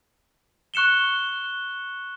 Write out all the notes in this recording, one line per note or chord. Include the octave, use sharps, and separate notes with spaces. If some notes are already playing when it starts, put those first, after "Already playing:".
C#6 F#6 C#7 E7 G7